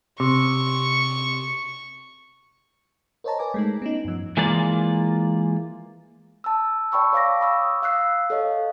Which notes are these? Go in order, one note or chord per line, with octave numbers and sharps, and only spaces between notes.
C3 C#6
A#4 C5 C#5 D#5 A5 A#5
B4 G#5 D6
G#3 A3 D#4
B3 C#4 D#4
G2 F3
E3 G#3 A#3 F4 D5
A5 E6
D5 G5 A5 B5 C#6 E6
C#5 F5 D6 A#6
B5 C#6 D#6 E6
F5 E6 F#6 C7
A4 C#5 D#5 F5